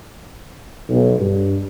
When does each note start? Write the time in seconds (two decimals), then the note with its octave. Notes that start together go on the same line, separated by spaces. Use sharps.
0.89 B1
1.19 G2